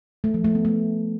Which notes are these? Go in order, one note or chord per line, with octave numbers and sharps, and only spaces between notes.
A3
F3
A3
B3
A3